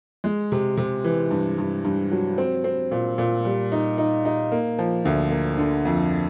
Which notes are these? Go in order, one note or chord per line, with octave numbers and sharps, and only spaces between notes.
G#3
C3
C3
E3
G2
G2
G2
F#3
C4
C4
A#2
A#2
G3
D#4
D#4
D#4
A#3
F3
D2
A#3
D3
F2